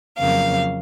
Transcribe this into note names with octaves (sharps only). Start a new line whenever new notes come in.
F2 C#3 F#3 A#3 F5